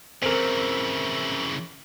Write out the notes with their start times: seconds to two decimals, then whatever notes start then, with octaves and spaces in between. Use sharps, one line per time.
0.22 C#3 E3 C4 A#4